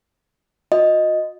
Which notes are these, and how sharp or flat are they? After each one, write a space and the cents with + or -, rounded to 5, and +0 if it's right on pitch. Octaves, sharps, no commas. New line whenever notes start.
F#4 -45 D#5 +0